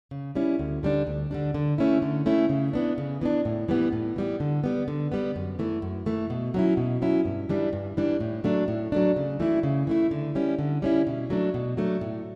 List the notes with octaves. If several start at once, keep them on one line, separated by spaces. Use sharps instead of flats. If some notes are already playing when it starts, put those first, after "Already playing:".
C#3
G3 C#4 E4
D2
D3 G3 D4
D2
D3 G3 D4
D3
A3 C#4 E4
D3
A3 C#4 E4
C#3
E3 B3 D4
C#3
E3 B3 D4
A2
E3 G3 B3
A2
E3 G3 B3
D3
G3 B3
D3
G3 B3
F#2
E3 A3
F#2
E3 A3
B2
F#3 C#4 E4
B2
F#3 C#4 E4
G2
E3 G3 D4
G2
E3 G3 D4
A2
F#3 A3 D4
A2
F#3 A3 D4
C#3
E3 A3 E4
C#3
E3 A3 E4
D3
G3 C#4 E4
D3
G3 C#4 E4
B2
F#3 A3 D4
B2
F#3 A3 D4
A2